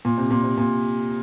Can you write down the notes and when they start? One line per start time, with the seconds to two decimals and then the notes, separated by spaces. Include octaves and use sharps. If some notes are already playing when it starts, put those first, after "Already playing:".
0.05 A#2
0.18 C3
0.31 A#2
0.44 C3
0.58 A#2